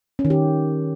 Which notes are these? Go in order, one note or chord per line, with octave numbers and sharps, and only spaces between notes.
C#4
D#3
G4